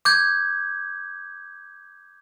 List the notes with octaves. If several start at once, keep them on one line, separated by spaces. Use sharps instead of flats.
D6 G6 G#6